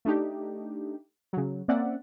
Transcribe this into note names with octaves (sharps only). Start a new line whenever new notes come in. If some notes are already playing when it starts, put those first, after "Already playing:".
A3 D4 D#4 G4
C#3 F#3
A#3 C4 C#4 D5 E5 F#5